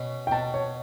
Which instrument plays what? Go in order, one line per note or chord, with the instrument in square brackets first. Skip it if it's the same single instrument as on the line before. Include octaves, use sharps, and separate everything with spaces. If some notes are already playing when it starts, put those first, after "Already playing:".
Already playing: [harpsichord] B2 C#4
[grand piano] G5
[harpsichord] B2 [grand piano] A5
[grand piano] C#5